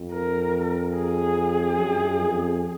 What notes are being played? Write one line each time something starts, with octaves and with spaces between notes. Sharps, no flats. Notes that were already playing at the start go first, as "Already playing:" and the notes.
Already playing: F2
A#4
G#4
F#2
F2